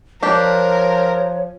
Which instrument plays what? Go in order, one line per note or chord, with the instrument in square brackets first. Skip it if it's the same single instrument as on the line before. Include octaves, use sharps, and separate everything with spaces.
[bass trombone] F3 [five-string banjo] D4 G4 [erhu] A#4 [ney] C#5